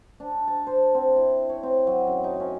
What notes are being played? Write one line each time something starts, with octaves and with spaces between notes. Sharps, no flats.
D4
A5
C5
C4
E4
C#5
C4
F#3
F#2
D#4
C#4